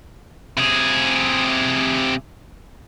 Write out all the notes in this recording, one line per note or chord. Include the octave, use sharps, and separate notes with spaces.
C3 G#4